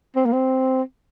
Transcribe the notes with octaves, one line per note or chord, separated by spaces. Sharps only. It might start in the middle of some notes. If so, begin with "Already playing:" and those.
C4
A#3
C4